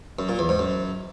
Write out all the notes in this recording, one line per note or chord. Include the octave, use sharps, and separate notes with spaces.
F#2
A#2
E2
G#2
F#2